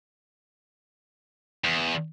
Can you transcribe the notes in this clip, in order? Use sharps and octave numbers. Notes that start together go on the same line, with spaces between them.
E2